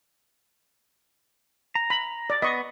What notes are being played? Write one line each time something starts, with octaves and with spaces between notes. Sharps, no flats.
A#5
B5
D5
B3 D#5 C#6